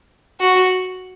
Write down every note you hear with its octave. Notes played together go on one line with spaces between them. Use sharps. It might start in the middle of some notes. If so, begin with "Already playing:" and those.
F#4